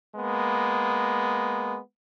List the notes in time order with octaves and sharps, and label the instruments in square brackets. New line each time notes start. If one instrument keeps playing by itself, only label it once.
[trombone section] G#3 A#3 B3